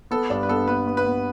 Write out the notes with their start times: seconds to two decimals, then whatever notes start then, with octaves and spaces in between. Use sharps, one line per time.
0.11 B3 A4
0.30 G2 D4
0.43 B4
0.49 B3 A4
0.68 B3 B4
0.87 B3
0.97 B4
1.06 B3